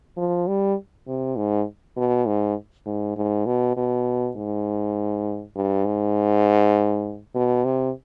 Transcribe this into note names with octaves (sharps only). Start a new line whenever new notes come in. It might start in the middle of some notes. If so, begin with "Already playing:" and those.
F3
G3
C3
G#2
B2
G#2
G#2
G#2
B2
B2
G#2
G2
G#2
B2
C3